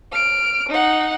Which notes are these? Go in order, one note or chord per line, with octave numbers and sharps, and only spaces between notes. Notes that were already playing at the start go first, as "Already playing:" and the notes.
F6 D7
D#4 F#5